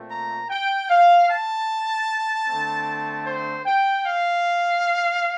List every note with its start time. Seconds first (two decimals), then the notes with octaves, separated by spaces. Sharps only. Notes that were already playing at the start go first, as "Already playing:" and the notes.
Already playing: A#2 A3 C4
0.10 A#5
0.50 G5
0.89 F5
1.29 A5
2.48 D3 A3 C4
3.26 C5
3.66 G5
4.06 F5